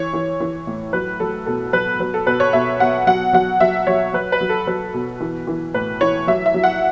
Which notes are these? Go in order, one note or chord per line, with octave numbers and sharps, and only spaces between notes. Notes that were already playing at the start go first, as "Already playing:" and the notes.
Already playing: E3 C#5
E3
E3
A2
F#3 B4
F#3 A4
B2 A4
F#3 B4
F#3 B4
A4
B2 B4
C#5
B2 E5
B2 F#5
F#3 F#5
F#3 F#5
F#3 E5
F#3 C#5
F#3 B4
B4
F#3
A4
F#3 B4
B2
E3
E3
A2 B4
E3 C#5
F#3 E5
E5
F#3
F#5